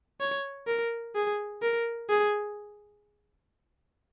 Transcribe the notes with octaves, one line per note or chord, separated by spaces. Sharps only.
C#5
A#4
G#4
A#4
G#4